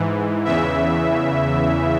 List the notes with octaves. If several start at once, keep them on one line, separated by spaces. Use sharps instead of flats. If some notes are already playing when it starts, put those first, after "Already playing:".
Already playing: G#2 E3
E2 C#3 E3 E5